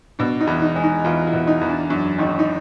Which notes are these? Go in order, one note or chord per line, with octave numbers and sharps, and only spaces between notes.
B2 D4
D#4
E2
D#4
G#3
D#4
E2 F4
E4
B2
D#4
E2
D4
F#2 D4
G#1 D#4
D#4